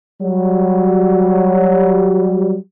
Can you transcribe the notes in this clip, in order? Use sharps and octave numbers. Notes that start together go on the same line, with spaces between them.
F#3 G3